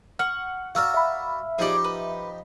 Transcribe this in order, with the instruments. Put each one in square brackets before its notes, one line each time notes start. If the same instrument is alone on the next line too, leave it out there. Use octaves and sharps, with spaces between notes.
[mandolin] F#5 C#6 [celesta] F6
[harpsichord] F#4 A#4 D5 [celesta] F5 E6 F6
[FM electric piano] E5 B5
[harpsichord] F3 D#4 G4 [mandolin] G#4 D5
[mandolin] B4